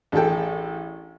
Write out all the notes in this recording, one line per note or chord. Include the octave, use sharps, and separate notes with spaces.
A1 D4 G#4 A4 G5